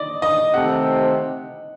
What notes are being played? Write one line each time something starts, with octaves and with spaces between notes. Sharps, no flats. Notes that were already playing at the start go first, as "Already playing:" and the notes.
Already playing: D5 D#5
D#5
C3 D#3 A3 C4 G4 F#5